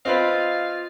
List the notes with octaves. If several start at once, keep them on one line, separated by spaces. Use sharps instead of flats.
C4 F4 B4 D#5 F5